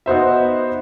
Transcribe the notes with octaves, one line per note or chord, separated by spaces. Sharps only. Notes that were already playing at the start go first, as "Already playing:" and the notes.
B3 D#4 F#4 C5 E5